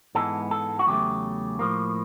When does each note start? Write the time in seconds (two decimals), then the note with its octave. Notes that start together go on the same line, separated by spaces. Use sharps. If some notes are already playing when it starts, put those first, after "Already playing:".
0.15 G#2 E3 G#3 B3 A4
0.51 A4
0.79 F#4
0.87 E2 C#3 F#3 A3 G4
1.59 A2 F3 A#3